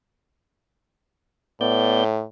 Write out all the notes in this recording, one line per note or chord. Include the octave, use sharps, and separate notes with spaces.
A2 B3 D5 G6